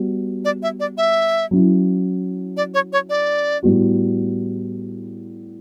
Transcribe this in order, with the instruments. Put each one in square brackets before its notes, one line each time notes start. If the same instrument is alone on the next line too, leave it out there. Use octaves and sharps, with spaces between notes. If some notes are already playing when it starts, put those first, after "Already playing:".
Already playing: [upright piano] G3 B3 F#4
[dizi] D5
E5
D5
E5
[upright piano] F#3 C#4 E4
[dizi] D5
C#5
C#5
D5
[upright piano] A2 G3 B3 F#4